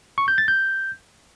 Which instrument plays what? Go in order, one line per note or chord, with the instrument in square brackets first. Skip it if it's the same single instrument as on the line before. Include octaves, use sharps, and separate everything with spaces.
[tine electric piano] C#6
G6
A6
G6